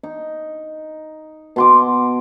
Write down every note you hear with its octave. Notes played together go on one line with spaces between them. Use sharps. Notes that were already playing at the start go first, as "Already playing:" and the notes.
D#4
B2 C6 D6